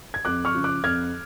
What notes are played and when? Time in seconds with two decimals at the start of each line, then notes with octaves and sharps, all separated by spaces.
0.14 G#6
0.25 F2 D6 F#6
0.45 C#6 F6
0.54 C#3 F3
0.64 D6 F#6
0.84 F2 F6 G#6